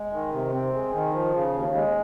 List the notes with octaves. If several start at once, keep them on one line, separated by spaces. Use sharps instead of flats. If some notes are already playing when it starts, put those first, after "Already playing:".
Already playing: G#3
D#3
C3
C4
G#3
D#3
F3
C#3
D#2
G#3